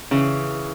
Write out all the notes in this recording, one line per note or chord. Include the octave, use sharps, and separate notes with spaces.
C#3 E3